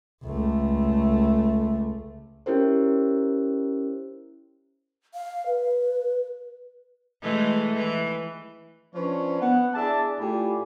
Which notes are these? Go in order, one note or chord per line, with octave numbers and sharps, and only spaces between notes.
C#2 A3
C#4 E4 G4 A#4 C5
F5
B4
E3 G#3 A3
E3
F3 C#4 D4 B4 C#5
B3 F#5
D4 E4 G#4 D5 E5 A5
A2 F4 G4 D5 G#5 B5